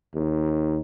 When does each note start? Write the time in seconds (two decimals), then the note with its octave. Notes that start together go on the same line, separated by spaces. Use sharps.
0.15 D#2